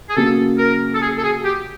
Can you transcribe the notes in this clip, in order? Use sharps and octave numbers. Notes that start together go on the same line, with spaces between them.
G#4
C#3 F#3 A#3 A4
A#4
A4
G#4
A4
G#4
G4